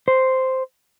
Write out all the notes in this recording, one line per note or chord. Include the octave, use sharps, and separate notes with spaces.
C5